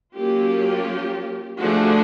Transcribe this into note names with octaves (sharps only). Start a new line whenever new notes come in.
F#3 A#3 C#4 F4 G4
D3 F3 A3 D4 F#4 G#4